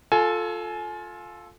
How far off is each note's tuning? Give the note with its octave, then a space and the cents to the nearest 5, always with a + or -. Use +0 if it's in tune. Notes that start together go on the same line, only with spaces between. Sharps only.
F4 +15 A4 +0 G#5 +30